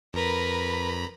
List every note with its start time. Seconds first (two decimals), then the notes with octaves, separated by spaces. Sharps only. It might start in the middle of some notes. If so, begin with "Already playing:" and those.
0.14 F2 A#4 B4 A#5 B5